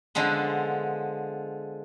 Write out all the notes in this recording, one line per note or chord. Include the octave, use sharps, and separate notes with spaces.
D3 F3 G#3 B3